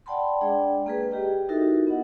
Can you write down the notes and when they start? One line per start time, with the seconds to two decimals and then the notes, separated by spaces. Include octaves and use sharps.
0.06 D5 F#5 G5 A5 B5 C6
0.41 G#3 D4 G#4 D5 G5
0.86 A#3 G#4 B4
1.11 G4 G#4 D#5 G5
1.49 D#4 E4 F#4 A4 A#4 E5
1.87 B3 D#5 F#5